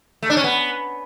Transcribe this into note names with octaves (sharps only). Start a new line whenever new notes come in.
A3
D4
C#4
B3